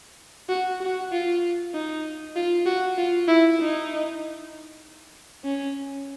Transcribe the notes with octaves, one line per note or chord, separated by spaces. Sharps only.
F#4
F#4
F4
D#4
F4
F#4
F4
E4
D#4
C#4